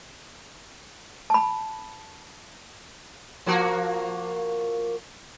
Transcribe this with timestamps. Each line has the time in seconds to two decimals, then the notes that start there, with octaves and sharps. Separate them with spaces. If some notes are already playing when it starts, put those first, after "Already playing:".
1.30 A5 B5
3.46 F3 A#3 F#4